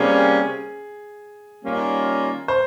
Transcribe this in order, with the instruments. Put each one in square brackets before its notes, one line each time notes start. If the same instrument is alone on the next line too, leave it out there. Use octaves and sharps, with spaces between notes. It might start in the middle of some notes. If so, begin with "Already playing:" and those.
Already playing: [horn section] C3 G3 A#3 C#4 [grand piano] G#4
[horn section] D#3 G3 A#3 C#4 F4
[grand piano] C5